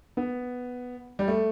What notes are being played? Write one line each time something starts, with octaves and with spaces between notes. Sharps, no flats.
B3
G3
A3